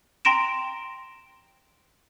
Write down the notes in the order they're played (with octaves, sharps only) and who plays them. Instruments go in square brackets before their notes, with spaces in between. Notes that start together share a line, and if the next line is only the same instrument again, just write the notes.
[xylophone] G5 A#5 C6 A#6 D7 E7